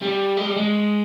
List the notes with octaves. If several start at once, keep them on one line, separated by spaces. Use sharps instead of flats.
G3
G#3
G3
G#3